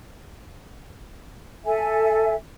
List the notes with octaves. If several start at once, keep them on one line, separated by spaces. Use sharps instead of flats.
A4 E5 G#5